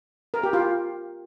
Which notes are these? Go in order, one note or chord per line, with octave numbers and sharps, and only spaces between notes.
A#4
G4
F4